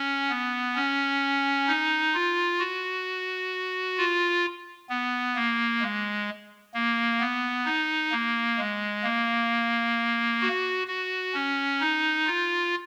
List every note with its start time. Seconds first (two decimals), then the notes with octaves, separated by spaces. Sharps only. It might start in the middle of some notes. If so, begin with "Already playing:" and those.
Already playing: C#4
0.30 B3
0.76 C#4
1.67 D#4
2.14 F4
2.60 F#4
3.97 F4
4.90 B3
5.36 A#3
5.82 G#3
6.74 A#3
7.20 B3
7.65 D#4
8.12 A#3
8.58 G#3
9.03 A#3
10.42 F#4
10.88 F#4
11.34 C#4
11.81 D#4
12.27 F4